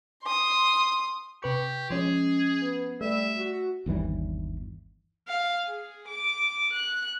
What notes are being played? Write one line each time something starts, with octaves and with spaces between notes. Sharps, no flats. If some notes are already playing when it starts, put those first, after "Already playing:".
C6 D#6
C3 G4 B4 C#6
F3 G#3 C#4 G#4
B3
G3 A3 E5
F#4
G1 D#2 E3 G3
F5
G#4
D6
F#6